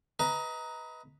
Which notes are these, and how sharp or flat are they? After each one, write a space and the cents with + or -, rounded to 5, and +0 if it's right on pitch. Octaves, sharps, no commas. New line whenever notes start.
B4 +0 D#5 +25 A#5 +0